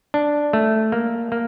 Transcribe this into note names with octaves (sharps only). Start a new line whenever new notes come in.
D4
A3
A#3
A#3